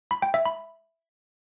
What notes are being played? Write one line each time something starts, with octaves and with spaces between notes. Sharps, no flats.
B5
G5
E5
B5